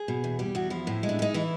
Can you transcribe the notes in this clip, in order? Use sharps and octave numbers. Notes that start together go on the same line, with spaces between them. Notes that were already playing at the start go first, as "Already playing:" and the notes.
Already playing: G#4
B2
E2
G3 G4
E2 F#4
F3 E4
A2
G#3
D4
C#4
D#4
E3 E4